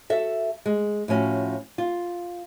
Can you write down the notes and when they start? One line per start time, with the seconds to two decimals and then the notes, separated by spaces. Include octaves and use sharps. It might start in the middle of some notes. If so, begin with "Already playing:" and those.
0.10 F#4 A4 E5
0.66 G#3
1.08 A2 F3 C#4 F#4
1.78 F4